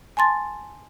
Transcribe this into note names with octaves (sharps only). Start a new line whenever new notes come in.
G#5 A5 C6 A6